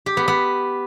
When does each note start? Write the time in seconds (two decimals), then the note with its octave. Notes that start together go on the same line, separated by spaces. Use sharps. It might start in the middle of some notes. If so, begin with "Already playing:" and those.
0.06 G4
0.17 B3
0.28 B3